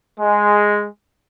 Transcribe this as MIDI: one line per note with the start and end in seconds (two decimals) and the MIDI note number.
0.20 0.87 56